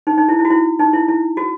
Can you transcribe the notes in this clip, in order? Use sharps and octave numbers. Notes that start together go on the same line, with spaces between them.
D#4
D#4
E4
E4
F#4
E4
D#4
E4
E4
F#4